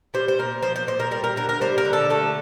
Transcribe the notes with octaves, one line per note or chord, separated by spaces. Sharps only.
G3 C5
C5
A#2 A#4
F3 C5
C5
A#2 C5
A#4
G3 A#4
A#4
D3 A#4
A#4
G3 C5
A#4
D3
A4
A3 A4